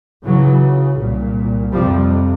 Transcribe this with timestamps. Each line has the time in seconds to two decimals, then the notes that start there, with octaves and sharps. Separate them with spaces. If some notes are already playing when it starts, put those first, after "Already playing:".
0.24 C#2 C#3 E3 F#3
0.98 C2 A#2
1.72 F2 C3 F3 G3